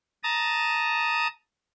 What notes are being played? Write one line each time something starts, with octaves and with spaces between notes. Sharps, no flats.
A5 A#5 D#6